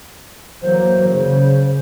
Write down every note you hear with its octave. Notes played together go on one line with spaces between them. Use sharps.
E3 F#3 A#3 C5
C#3 C5